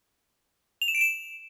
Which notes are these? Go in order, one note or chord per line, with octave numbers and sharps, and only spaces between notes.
F7
E7
D7
E7